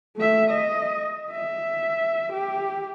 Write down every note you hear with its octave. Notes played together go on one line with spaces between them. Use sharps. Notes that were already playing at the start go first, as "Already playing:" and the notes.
A3 E5
D#5
E5
G4